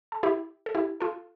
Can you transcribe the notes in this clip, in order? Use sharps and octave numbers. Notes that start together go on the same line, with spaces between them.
A4
E4 G4
A4
E4 G4
F4 A4